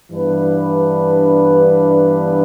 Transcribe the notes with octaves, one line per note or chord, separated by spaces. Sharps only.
G2 E3 B3 D4 B4